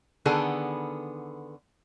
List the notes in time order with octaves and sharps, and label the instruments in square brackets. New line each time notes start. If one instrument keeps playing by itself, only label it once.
[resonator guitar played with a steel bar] D3 D#3 B3 G#4 A4